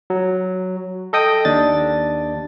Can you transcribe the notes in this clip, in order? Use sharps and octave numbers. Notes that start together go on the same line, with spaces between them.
F#3
A4 D#5 G5 D#6
D#2 D4 A6